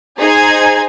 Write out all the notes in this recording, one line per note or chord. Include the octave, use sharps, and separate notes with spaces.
D#4 G#4 C5 G#5 G#6